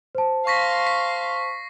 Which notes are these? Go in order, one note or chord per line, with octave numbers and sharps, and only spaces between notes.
C5 A5
F5 C6 C#6 A#6 B6
B6 C7